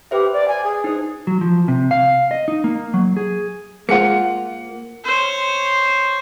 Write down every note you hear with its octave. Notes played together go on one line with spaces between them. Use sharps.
G4 B4 C5 E5
D5
G#5
G#4
D#4 C5
F#3
F3
C3
F5
D#5
D#4
A#3
F#3
G#4
G#3 A#3 F4 G#4 C5 F#5 C#7
C5 C#5